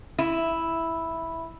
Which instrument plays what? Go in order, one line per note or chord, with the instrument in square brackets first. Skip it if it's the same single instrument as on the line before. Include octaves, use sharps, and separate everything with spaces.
[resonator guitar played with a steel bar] E4